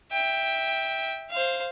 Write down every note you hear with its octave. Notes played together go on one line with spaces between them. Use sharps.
E5 G5
C5 F5